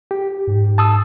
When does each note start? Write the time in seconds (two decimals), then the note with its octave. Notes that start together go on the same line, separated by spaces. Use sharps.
0.11 G4
0.47 G#2
0.78 A5 D#6 E6